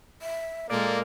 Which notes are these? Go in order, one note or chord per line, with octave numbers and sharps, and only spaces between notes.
E5
A#2 G#3 A#3 A4 A#4 D5